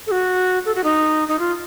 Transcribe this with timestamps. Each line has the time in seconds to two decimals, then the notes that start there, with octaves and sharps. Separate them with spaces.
0.07 A4
0.11 F#4
0.65 A4
0.75 F#4
0.84 D#4
1.28 D#4
1.39 F4